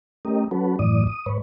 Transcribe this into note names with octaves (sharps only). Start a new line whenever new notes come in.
A3 C#4 G4 A#4 D#5
F#3 C#4 F#4 A4 B4
F#2 A2 E3 D5 D#6
D#6
G#2 B4 C#5